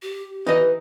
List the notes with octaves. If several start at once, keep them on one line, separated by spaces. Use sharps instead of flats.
G4
E3 D#4 B4 D#5